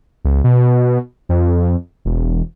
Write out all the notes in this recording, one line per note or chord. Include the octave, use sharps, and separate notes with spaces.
C#2
B2
F2
E1